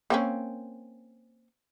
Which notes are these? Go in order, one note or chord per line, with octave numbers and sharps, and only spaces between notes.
A#3 C4 C#4